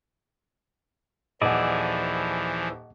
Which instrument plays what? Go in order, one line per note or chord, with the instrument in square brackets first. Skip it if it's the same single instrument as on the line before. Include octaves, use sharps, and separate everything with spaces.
[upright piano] D#1 [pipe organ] E3 F3 [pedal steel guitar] E4 G#4 D5 [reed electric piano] D#5 F#5